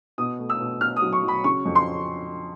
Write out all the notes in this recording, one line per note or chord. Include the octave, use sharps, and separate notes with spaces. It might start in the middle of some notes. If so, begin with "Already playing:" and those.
B2 D#6
A3
E6
B2
B2 F6
D#6
F#3
C#6
F#3
B5
C#3 C#6
F2
C6